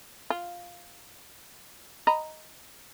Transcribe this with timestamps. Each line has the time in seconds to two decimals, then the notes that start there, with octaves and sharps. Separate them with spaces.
0.30 F4
2.07 D#5 A#5 B5